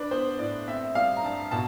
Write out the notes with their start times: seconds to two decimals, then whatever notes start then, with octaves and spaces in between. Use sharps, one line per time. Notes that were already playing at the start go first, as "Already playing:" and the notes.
Already playing: D4 B4
0.11 B3 C5
0.39 A2 D5
0.68 C4 E5
0.95 G3 F5
1.17 A#5
1.24 G2 A5
1.51 B2 A5